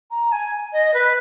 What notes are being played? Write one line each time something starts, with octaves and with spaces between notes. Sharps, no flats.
A#5
G#5
D#5
B4